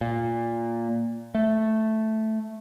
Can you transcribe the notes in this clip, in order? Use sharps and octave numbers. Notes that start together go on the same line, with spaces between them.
A#2
A3